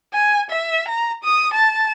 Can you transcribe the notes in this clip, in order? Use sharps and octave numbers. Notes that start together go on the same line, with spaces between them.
G#5
E5
A#5
D#6
A5